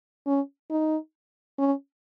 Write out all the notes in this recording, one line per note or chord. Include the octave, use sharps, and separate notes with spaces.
C#4
D#4
C#4